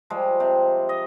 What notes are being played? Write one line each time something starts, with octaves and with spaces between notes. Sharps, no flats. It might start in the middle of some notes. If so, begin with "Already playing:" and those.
F3 G3 G#3
C3
D#5